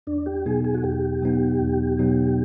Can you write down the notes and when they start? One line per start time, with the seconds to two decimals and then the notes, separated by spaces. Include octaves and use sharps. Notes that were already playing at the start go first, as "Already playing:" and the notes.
0.07 E2 D4
0.26 G4
0.46 B2 F#3 B3 D#4 G#4
0.64 G#4
0.74 F#4
0.84 E2 G4
1.22 B2 F#3 B3 D#4
1.61 E2
1.99 B2 F#3 B3 D#4